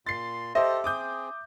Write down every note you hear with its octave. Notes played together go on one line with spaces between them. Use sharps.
A#2 C6 A6 C7
G4 A4 C5 D#5 E5
C4 G#4 D6 D#6 G6